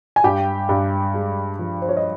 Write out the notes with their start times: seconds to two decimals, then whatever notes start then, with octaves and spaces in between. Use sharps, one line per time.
0.16 G#5
0.24 G2 G4 G5
0.69 G2
1.14 G#3
1.59 F3
1.82 C5
1.89 C#5
1.97 D#5